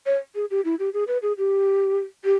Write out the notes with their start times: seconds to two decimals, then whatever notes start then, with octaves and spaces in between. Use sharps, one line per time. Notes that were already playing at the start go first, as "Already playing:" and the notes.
0.06 C#5
0.35 G#4
0.51 G4
0.65 E4
0.79 G4
0.94 G#4
1.08 B4
1.23 G#4
1.38 G4
2.25 G4